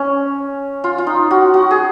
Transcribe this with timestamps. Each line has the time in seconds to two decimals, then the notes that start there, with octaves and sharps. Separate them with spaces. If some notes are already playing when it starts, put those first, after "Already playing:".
Already playing: C#4
0.84 F4
0.98 F4
1.07 D#4
1.31 F#4
1.54 F#4
1.71 G#4